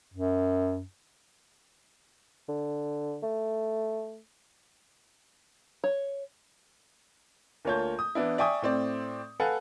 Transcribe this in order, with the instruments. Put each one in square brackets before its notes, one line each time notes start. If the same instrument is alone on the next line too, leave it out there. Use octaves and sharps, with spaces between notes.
[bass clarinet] F#2
[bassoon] D3
A3
[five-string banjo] C#5
[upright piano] D2 A#3 F4 C#5 A5 G6
D#6
E3 B3 D4 E4
D5 E5 G5 G#5 C#6 D#6
A2 C4 D5
A4 B4 F5 F#5 G#5